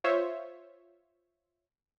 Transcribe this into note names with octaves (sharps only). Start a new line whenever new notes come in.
F4 C5 C#5 E5